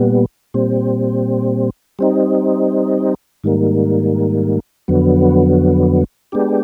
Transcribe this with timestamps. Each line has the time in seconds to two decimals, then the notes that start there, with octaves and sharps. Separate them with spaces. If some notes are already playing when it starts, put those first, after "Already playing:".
Already playing: A#2 G3 B3
0.54 A#2 G3 C4
1.99 G3 C4 D#4
3.44 G#2 D#3 G3 A#3
4.88 F2 D3 F#3 B3
6.32 G#3 B3 D4 G4